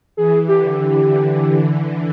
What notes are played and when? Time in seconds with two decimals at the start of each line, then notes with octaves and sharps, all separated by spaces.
0.17 E3 G#4
0.48 D3 G4